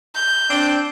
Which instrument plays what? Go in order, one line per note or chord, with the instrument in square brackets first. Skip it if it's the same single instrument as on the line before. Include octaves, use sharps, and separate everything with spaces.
[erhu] G6
[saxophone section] C4 D4